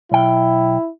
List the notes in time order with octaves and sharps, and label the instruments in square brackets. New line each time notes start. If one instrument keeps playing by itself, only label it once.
[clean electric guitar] B1 G5 [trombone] E4